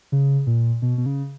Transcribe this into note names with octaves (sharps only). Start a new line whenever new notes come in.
C#3
A#2
B2
B2
C#3